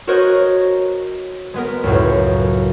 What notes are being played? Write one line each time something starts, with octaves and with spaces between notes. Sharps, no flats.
F#4 A#4 C5 C#5 D#5 F#6
G#3 B3 A#4
C#2 F#2 A2